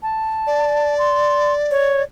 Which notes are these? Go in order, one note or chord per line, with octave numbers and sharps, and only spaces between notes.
A5
D5
C6
C#5